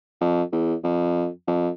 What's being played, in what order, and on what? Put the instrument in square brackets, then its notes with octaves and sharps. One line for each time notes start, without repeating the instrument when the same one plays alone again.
[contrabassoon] F2
E2
F2
F2